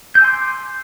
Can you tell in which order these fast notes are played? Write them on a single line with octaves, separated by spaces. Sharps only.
G6 E6 G#5 C6 D6